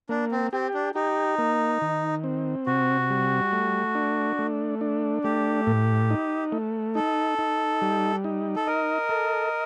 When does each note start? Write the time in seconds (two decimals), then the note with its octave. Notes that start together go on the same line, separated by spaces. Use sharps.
0.09 A#3 D4
0.32 C4
0.53 C4 G4
0.74 D4
0.95 D#4 G4
1.38 A#3
1.82 D#3
2.24 C4
2.66 C3 F#4
3.10 G3
3.53 A3
3.95 D4
4.39 A3
4.81 D4
5.24 A3 G4
5.67 A2
6.10 D#4
6.52 A3
6.95 D#4 A4
7.39 D#4
7.82 G3
8.24 D#4
8.56 A4
8.67 A#4 D#5
9.09 A4